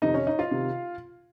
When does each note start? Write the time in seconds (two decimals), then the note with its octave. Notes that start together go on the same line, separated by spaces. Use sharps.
0.02 F2 C3 D#3 D#4 D#5
0.14 C#4 C#5
0.27 D#4 D#5
0.39 F4 F5
0.51 C3 D#3